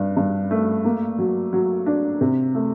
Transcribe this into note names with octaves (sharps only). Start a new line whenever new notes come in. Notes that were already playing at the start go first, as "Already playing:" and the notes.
Already playing: G2
G2
A3
A#3
F#3
F#3
D4
C3
A3